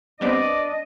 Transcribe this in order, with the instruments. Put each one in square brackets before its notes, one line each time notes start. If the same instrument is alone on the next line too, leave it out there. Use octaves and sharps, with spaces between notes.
[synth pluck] G3 B3 C4 [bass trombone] D4 [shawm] D5 [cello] D#5